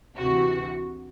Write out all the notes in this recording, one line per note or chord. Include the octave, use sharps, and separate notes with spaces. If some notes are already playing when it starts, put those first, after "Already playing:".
D2 C3 E3 F#4